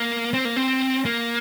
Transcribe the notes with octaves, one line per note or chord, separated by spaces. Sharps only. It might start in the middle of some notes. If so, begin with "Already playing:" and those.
Already playing: A#3
C4
A#3
C4
A#3